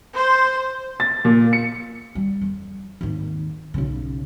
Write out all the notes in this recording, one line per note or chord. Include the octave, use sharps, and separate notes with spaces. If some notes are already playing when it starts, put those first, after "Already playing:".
C5
A6
A#2
C#7
G3
F2
G#1 D#2
B1 C#3